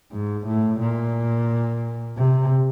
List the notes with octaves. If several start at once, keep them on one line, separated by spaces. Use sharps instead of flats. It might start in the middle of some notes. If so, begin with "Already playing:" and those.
G#2
A2
A#2
C3